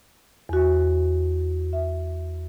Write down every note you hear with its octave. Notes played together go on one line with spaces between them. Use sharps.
E2 F#4
E5